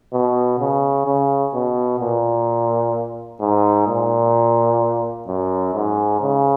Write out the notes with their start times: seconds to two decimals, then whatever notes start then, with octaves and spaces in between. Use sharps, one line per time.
0.13 B2
0.59 C#3
1.06 C#3
1.54 B2
2.00 A#2
3.40 G#2
3.87 A#2
5.27 F#2
5.74 G#2
6.21 C#3